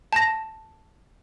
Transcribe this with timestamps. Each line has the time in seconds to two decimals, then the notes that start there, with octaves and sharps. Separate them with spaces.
0.13 A5 A#6